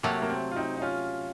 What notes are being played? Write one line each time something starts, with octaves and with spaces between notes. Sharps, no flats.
C3 F#3 A3 A#3
A#3
C4
F4
C4 D#4
D#4
C#4 F4